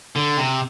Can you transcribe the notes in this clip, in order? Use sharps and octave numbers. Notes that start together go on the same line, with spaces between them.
D3
C3